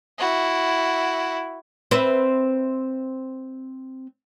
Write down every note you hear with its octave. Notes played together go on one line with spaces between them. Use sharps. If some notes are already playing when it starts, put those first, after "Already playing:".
E4 F#4
C4 B4 E5